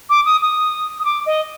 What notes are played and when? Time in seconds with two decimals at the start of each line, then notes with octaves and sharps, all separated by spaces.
0.10 D6
0.26 D#6
0.42 D#6
0.99 D#6
1.05 D6
1.26 D#5